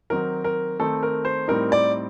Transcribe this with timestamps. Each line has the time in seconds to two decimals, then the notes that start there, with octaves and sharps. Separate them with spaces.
0.10 D#3 F#3 C4 D#4 A#4
0.44 A#4
0.79 D#3 A3 C4 D#4 A4
1.03 A#4
1.25 C5
1.48 A2 G3 C4 D#4 A#4
1.72 D5